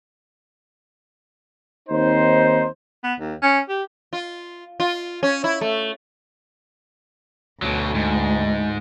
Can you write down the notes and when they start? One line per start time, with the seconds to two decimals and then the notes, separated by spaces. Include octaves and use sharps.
1.89 D#2 C4 D#4 C5
3.04 B3
3.19 D#2
3.43 C#4
3.69 G4
4.13 F4
4.80 F4
5.23 C#4
5.44 E4
5.61 A3
7.62 D2 B2 F#3
7.95 G#2